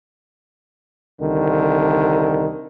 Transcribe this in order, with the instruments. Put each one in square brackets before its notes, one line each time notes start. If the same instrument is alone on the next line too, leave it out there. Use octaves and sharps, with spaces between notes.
[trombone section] C2 D3 D#3